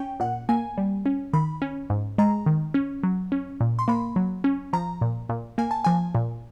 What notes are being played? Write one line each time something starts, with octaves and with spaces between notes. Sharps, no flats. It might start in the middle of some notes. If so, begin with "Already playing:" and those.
Already playing: C#4 G5
A#2 F#5
A#3 G#5
G3
C#4
D#3 B5
C#4
G#2
G#3 A#5
D#3
C#4
F#3
C#4
A#2
C6
A#3 B5
F#3
C#4
F3 A#5
A#2
A#2
A#3 G#5
A5
F3 G#5
A#2